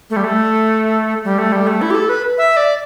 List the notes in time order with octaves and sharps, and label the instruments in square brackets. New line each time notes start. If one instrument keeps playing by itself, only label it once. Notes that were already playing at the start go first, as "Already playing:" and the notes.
[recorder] A3
G3
A3
G3
A3
G3
A3
E4
G4
A4
B4
E5
D5